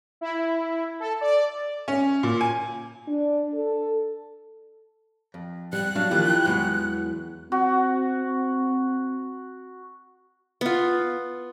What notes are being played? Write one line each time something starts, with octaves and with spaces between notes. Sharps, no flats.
E4
A4
D5
C#4
A#2
G#5
D4
A4
F2
G3 F#6
F#3 D4 F5
D#3 F3 A#3 E4 F4 G4
E2 F#3 G#3 B3
C4 F#4
B3 F4